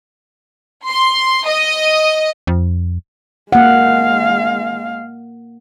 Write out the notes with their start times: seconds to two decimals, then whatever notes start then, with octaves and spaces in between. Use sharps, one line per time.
0.88 C6
1.48 D#5
2.47 F2
3.52 G#3 A#3 F5 F#5